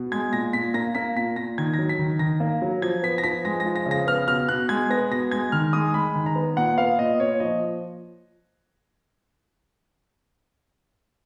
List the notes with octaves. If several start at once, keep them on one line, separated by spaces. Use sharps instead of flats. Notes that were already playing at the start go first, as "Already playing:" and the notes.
Already playing: B2
G#3 G#6
A#2 A#6
A#2 B6
A#3 A#6
A#3 B6
A#2 B6
A#2 A#6
D#3 G#6
A#6
F#3
B6
D#3
D#3 A#6
A#3
F#3
F3 G#6
B3 B6
A#6
F3 B6
G#3 A#6
A#6
F3
A#6
C#3 A#6
B3 F6
B2 F6
B2 F#6
G#3 G#6
B3 A#6
B2 A#6
G#3 G#6
D#3 F6
G#3 D#6
G#3 B5
D#3
A#5
B3
A#2 F#5
B3 F5
A#2 D#5
A#2 C#5
F3 D#5